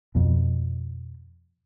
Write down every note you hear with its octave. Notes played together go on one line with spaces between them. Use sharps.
F2 B2